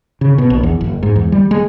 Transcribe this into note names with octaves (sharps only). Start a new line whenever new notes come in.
C#3
B2
A#1
E2
F#1
G#2
E2
G3
G#3